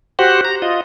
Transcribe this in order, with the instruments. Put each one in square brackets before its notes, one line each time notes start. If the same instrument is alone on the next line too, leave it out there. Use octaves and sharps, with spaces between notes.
[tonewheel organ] F#4 G4 C5 F#5
A#5
F4 D#5